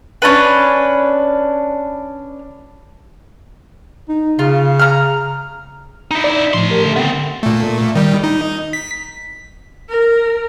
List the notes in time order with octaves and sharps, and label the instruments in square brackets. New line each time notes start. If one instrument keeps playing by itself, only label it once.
[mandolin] C#4 D4 B4
[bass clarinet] D#4
[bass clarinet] C#3 [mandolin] F4
[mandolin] A#5 F6
[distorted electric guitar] D#4 E4
[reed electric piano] D5
[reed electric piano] A2 F3 [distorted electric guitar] A3 C6
[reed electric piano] G4 A#4
D3 A4
[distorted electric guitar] B3 C4
[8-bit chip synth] A#2 A3
D#3 G3
D#4
B6
[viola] A#4